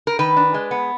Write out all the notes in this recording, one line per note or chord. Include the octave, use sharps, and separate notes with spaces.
A#4
D#3 B4
D4
G#3
B3